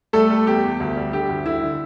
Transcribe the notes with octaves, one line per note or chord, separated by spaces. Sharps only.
G3 A3 A4
G3
E2 G4
E2
D2
G3
D3 G4
D2
D3 E4
D3